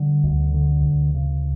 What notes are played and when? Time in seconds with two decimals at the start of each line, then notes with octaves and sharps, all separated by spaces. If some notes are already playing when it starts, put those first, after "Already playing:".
Already playing: D3 G3
0.24 D2
0.54 D3
0.85 D2
1.14 C#3